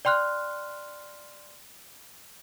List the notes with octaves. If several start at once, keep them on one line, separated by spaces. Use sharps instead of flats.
D5 G5 C6 F6 F#6